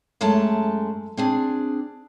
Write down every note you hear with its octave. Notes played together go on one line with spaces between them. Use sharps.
F#2 G#3 A3 A5
C4 D4 G#4